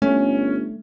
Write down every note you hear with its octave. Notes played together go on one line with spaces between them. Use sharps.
G1 A3 C#4